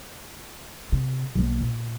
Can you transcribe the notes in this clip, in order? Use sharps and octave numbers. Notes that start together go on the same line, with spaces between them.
C3
B1 A#3
A#2